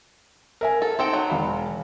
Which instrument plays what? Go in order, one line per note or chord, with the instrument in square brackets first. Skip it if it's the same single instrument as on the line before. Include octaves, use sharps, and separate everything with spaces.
[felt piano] A#4 E5 G#5
[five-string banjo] A4
[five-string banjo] C4 A4 G5 [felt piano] D#4
[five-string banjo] F#3
[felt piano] E1 F5 B5